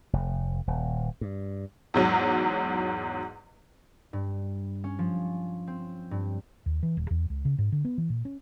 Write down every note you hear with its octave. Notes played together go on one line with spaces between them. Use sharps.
F1
D#1
G2
E2 G#2 F#3
G2
C#4
F3
C4
G2
D#2
E3
D#1
E2
C#2
C#3
G#2
D3
B3
E3
A#2
C#4